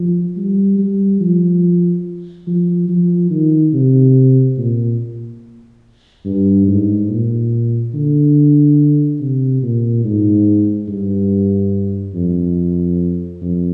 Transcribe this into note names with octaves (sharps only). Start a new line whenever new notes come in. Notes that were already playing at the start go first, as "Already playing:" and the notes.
Already playing: F3
G3
G3
F3
F3
F3
D#3
C3
A#2
G2
G#2
A#2
D3
C3
A#2
G#2
G2
F2
F2